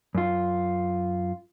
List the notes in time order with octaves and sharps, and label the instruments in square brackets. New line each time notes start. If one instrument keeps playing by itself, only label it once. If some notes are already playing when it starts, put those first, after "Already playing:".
[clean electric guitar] F#2 F4